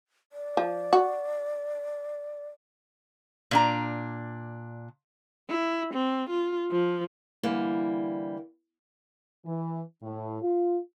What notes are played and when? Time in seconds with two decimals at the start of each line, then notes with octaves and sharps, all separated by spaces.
0.33 D5
0.57 F3
0.93 F#4
3.51 A#2 D4 A#5
5.50 E4
5.94 C4
6.30 F4
6.71 F3
7.43 D3 E3 G3 A#3
9.45 E3
10.02 A2
10.42 F4